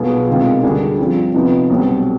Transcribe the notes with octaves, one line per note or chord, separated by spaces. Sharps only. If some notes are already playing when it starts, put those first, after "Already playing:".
Already playing: B1 B2 B3 F4 G#4
C3 D#3 G#3 B3 F4
D2 D3 G3 D4 G#4
G2 F3 C4
C3 F3 B3 D#4
B1 B2 G3 C4